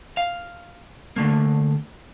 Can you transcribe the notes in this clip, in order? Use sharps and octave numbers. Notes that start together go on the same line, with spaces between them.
F5
D3 A3 A#3